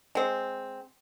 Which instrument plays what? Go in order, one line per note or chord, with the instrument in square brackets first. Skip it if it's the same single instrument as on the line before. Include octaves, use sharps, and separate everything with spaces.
[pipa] G#3 C4